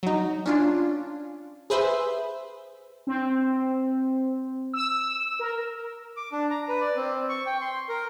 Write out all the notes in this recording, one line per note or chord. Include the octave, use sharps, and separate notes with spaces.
F#3 D#4
C#4 D4 F4
G#4 B4 C5 E5
C4
E6
A#4
D6
D4
A#5
B4
D5
C4
C#6
G5
C6
A#4